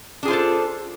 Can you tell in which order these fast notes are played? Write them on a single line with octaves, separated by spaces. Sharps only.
D4 G#4 F4 C5 A4